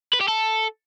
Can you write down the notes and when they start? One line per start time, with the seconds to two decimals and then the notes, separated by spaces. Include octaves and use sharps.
0.13 B4
0.21 G4
0.28 A4